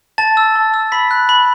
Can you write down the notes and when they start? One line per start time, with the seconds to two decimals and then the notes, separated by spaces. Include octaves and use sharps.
0.18 A5 A6
0.37 E6
0.56 A5
0.74 E6
0.92 B5 B6
1.11 F#6
1.29 B5